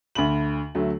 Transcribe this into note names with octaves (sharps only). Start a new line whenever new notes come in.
D2 B5 F#7
D2 F#3 A3